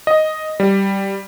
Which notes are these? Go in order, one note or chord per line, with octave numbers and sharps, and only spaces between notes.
D#5
G3